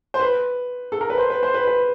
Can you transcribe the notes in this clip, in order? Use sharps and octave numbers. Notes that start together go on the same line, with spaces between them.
C5
B4
A4
A#4
B4
C5
B4
C5
B4
B4